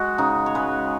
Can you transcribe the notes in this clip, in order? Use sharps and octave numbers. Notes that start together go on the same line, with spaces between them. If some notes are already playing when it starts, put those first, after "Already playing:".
Already playing: G#3 F#4
C#3 D#4
C#5
G#3 B4